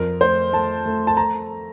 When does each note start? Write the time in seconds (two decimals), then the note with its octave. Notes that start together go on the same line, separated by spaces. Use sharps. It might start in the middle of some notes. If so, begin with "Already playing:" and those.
Already playing: F2 A#4
0.21 A3 C5
0.53 A3 A5
0.86 A3
1.07 A5
1.17 A#5